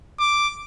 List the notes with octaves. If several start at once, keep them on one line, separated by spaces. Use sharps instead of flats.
D6